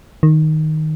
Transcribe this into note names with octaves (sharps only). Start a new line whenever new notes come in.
D#3